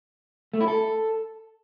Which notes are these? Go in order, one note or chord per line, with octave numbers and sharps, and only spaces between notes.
A3
E4
A4